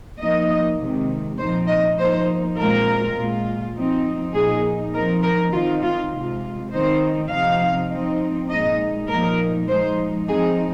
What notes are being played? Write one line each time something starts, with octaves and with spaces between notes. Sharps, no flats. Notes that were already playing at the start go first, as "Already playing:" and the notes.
F3 A#3 D#4 D#5
C3 D#3 G#3
A#2 F3 C4 D#4 C5
D#5
F3 A#3 D#4 C5
A#2 G#3 C4 F4 A#4
A#2 G#3 F4
F3 C4 D#4
A#2 F3 A#3 D#4 G#4
F3 C4 D#4 A#4
A#4
D#3 C4 D#4 F4
F4
C3 G#3 F4
D#3 C4 D#4 C5
C3 F3 C4 D#4 F5
F3 C4 D#4
A#2 G#3 D#4 D#5
A#2 F3 A#3 D#4 A#4
F3 G#3 D#4 C5
F3 C4 D#4 G#4